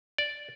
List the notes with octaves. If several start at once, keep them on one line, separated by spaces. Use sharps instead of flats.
D5